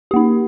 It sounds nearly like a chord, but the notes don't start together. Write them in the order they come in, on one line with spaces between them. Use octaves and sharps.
G4 A#3 D#4